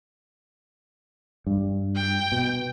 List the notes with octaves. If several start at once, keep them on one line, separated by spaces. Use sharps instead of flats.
G2
G5
B2